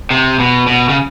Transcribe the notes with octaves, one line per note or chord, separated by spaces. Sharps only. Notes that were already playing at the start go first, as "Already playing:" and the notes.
C3
B2
B2
C#3